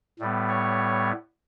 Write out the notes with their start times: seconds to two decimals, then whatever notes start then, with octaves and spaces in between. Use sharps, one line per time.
0.20 A2 G3 B3
0.48 C#5